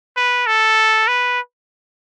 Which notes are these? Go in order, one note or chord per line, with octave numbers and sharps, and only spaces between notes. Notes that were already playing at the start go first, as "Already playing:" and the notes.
B4
A4
B4